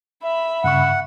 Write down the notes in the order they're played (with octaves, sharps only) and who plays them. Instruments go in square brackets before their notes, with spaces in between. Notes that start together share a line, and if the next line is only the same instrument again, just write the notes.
[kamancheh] E5 B5
[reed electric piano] G2 C#3 C#6 [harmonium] F#5